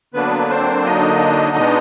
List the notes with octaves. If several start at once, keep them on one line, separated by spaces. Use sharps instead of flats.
D3 F#3 A#3 B3 D4 B4
C4 C5
D#4 D#5
B2 G#3 B3 D4